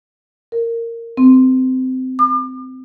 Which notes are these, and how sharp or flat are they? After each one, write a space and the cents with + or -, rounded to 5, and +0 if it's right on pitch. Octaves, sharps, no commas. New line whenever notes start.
A#4 -15
C4 -20
D6 +40